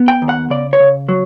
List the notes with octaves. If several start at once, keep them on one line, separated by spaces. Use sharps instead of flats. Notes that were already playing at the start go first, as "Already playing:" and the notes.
Already playing: B3
G5
D#2
F#5
C#3 D5
C#5
C#3
F#3